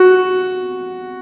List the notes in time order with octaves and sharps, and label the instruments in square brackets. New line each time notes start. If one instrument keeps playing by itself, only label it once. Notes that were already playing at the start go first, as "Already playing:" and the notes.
Already playing: [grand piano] F#4